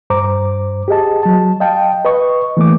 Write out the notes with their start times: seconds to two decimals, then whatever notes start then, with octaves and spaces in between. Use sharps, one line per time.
0.10 G2 C5 A#5 D6
0.88 G4 G#4 D#5 A5
1.23 F#3 A5
1.60 D#5 F5 G5 A5
2.05 B4 D#5 C#6
2.57 E3 A3 A#3 D6